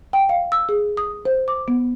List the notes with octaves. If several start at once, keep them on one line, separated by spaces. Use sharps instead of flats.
G5
F5
E6
G#4
D#6
C5
D6
B3